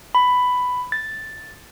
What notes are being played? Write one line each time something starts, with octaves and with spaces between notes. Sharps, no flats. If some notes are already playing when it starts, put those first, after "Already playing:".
B5
A6